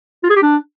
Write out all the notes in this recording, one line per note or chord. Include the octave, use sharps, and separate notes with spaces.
F4
G#4
G4
D4